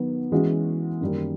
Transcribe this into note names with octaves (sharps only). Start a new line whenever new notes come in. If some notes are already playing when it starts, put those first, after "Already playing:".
Already playing: D#3 F#3 B3
E3 G#3 C#4 F#4
F#2 D#3 G3 A#3